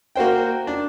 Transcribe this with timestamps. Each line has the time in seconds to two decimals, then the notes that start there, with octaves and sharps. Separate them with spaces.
0.16 A#3 F#4 C5 G5
0.67 D4